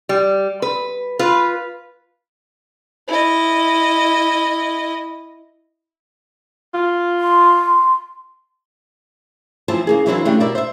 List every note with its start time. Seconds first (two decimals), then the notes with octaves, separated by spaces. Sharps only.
0.09 G3
0.62 B4
1.19 F4 B4
3.08 E4 D#5
6.74 F4
7.21 C6
9.68 E3 F3 C4 A5
9.87 C#3 A#3 G#4
10.06 E3 F#3 A#3 C4 D4 E4
10.25 C#3 A3 D4 G4
10.40 B2 A#4 D5 E5
10.55 C5 E5